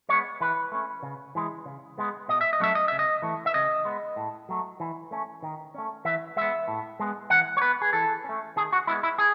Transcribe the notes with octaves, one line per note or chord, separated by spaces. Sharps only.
G#3 B3 C#5
E3 B4
A3 C#4
C#3
E3 G#3
C#3
G#3 B3
B2 D#5
E5
D#5
F#3 A3 C#4 E5
D#5
C#3 E5
D#5
E3 A3
E5
C#3 D#5
G#3 B3
A2
F#3 A3
E3
A3 C#4
D#3
A3 C#4
E3 E5
G#3 B3 E5
A2
G#3 B3
E3 F#5
C#5
B3 B4
G#4
E3 A4
A3 C#4
D#3 G#4
F#4
G#3 B3 E4
E4
G#4